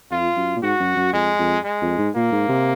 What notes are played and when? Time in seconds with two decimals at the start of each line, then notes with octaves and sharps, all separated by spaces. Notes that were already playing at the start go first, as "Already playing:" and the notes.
0.11 F2 F4
0.37 F#2
0.57 A#2
0.63 G#2 F#4
0.80 F#2
0.96 F#2
1.13 F2 G#3
1.39 F2
1.64 G#3
1.82 F2
1.98 G#2
2.15 A#2 A#3
2.32 G#2
2.49 C3